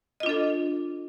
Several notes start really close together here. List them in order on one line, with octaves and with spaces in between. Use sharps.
D#5 F4 D4 A4